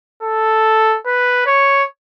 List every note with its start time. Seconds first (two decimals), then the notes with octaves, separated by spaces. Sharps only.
0.23 A4
1.06 B4
1.47 C#5